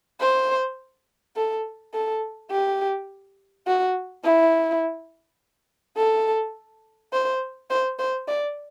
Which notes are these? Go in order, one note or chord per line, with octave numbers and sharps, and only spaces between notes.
C5
A4
A4
G4
F#4
E4
A4
C5
C5
C5
D5